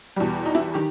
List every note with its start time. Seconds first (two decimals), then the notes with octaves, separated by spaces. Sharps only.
0.16 E2 B2 G3
0.45 D#4
0.55 E4
0.74 D#3 G4